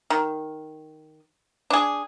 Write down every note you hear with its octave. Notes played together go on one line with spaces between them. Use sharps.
D#3
D4 G#4